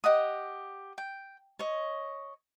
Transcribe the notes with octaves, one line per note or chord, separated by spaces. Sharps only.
G4 D#5 F#5 D#6
G5
C#5 D#5